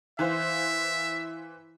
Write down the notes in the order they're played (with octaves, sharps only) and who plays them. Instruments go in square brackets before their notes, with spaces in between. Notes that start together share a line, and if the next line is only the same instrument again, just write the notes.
[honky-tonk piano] E3 C5 F5 [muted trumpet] E5